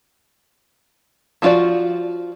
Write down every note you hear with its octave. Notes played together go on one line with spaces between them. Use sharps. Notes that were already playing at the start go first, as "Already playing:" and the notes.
F3 A#3 F4 F#4 D5